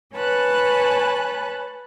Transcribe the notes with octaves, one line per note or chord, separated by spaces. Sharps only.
B4 C#5 G#5 A5 B5 F#6